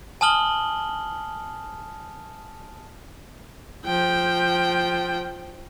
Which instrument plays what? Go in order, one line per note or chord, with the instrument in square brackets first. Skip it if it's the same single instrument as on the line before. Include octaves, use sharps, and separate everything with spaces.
[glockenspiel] G#5 A5 D#6 F6 F#7 G7
[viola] F3 G5